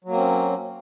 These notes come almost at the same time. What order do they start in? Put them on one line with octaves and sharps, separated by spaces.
F#3 A#3 C4 C#4